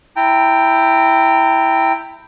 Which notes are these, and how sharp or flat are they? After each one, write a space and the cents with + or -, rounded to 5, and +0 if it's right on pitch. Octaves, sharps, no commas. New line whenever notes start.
E4 +0 G5 +0 A#5 -30